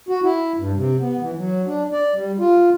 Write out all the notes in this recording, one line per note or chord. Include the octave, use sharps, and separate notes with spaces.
F#4
E4
G2
C3
B3
E3
F#3
D4
D5
G3
F4